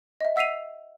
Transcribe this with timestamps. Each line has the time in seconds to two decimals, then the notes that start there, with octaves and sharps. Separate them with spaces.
0.21 D#5 E5
0.36 F#5 E6 B6 C7 D#7 F7